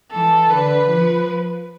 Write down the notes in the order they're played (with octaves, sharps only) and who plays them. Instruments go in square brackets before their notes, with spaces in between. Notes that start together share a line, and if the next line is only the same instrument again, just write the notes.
[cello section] E3 [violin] A4
[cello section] D3 [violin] B4
[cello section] F3